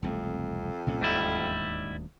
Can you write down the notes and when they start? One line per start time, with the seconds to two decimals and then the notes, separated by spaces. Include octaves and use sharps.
0.02 E1 C2 F2 A3
0.87 C2 A#2 C#4
1.01 D#1 D2 G#2 G3 E4